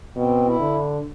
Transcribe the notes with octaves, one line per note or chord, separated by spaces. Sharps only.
B2 C4
E4
D3